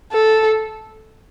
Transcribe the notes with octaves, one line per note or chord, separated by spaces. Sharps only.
A4